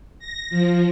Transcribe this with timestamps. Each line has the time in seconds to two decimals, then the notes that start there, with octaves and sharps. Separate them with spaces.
0.19 A#6
0.50 F3